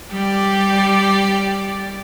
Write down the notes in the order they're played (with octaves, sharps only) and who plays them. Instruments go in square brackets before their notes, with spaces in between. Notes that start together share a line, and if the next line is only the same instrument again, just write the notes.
[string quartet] G3 G4 D5